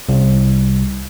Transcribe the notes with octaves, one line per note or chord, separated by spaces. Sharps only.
C2